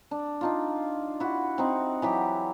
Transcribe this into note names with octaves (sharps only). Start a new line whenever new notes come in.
D4
D4 D#4 F4
E4 F#4
C4 D#4
E3 F#3 G4